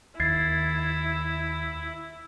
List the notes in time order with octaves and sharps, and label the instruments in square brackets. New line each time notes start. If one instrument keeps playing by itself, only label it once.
[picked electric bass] D#2 [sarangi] E4 [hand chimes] G#6 A6 C7